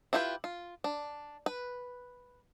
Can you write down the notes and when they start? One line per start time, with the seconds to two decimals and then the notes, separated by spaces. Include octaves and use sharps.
0.13 D4 E4 F4 G4 B4
0.44 F4
0.84 D4
1.46 B4